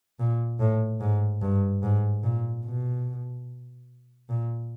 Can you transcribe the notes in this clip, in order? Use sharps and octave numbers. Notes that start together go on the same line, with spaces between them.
A#2
A2
G#2
G2
G#2
A#2
B2
A#2